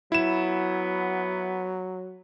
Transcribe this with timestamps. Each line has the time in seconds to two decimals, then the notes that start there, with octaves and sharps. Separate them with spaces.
0.12 F#3 B3 E4 E7